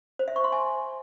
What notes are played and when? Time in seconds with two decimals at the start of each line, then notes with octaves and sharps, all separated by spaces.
0.19 C5
0.28 E5
0.36 C#6
0.44 C6
0.52 G#5